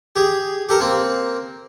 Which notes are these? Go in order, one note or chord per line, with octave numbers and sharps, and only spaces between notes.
G4 G#4
G4 A4 A#4
A#3 C4